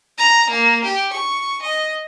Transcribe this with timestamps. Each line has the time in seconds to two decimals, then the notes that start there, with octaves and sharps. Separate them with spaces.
0.18 A#5
0.50 A#3
0.84 G4
1.13 C#6
1.62 D#5